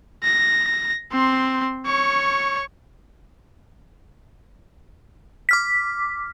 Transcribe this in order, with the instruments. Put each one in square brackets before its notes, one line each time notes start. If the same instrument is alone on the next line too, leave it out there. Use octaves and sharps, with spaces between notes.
[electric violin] A#6
C4 C6
C#5 C#6
[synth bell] D6 F6 B6